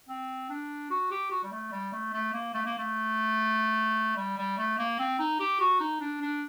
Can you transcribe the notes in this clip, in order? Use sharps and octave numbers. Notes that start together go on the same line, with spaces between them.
C4
D4
F#4
G4
F#4
G3
A3
G3
A3
A3
A#3
A3
A#3
A3
G3
G3
A3
A#3
C4
D#4
G4
F#4
D#4
D4
D4